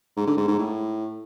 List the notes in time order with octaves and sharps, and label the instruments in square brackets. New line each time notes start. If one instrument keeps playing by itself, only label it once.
[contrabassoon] G#2
D3
G#2
G#2
A2